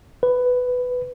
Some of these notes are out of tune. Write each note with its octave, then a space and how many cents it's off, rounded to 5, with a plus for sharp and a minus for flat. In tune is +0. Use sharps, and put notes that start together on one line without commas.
B4 +10